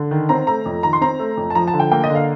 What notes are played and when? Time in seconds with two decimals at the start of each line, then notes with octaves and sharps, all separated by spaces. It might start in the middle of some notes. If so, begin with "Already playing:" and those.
Already playing: D3
0.11 D#3
0.29 C4 A#5
0.47 A3 A#5
0.66 F2
0.83 D#3 A#5
0.93 C6
1.01 C4 A#5
1.19 A3
1.37 F2
1.50 A5
1.55 F3 A#5
1.67 A5
1.73 D3
1.80 G5
1.92 A#3 G5
2.04 D#5
2.10 D3
2.15 F5